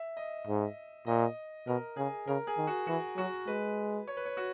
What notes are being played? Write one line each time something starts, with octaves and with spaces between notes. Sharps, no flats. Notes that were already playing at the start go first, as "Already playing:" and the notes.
Already playing: E5
D#5
G#2
A#2 D#5
B2 A#4
C#3 G#4
C#3 A#4
G#4
D#3
F#4
E3 F#4
F#3 F#4
G#3 B4
C#5
B4
C#5
F#4